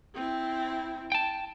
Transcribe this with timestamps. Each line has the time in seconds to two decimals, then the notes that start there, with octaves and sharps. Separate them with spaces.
0.15 C4 E4
1.12 G5 A5